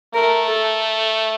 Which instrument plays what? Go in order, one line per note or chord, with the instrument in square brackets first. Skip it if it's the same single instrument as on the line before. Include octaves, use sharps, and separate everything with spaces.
[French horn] A3 [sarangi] A#4
[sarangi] A4